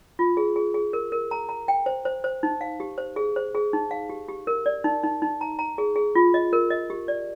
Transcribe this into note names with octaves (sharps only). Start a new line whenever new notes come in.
F4
G#4
G#4
G#4
A#4
A#4
A#5
A#5
G5
C5
C5
C5
D#4
F5
G4
C5
G#4
C5
G#4
D#4
F5
G4
G4
A#4
D5
D#4
D#4
D#4
A#5
A#5
G#4
G#4
F4
D#5
A#4
D#5
G4
D5